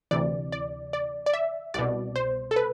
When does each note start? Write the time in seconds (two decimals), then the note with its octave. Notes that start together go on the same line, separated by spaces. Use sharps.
0.11 D2 C3 E3 D5
0.52 D5
0.93 D5
1.26 D5
1.33 E5
1.74 C2 B2 D5
2.16 C5
2.51 A4
2.56 B4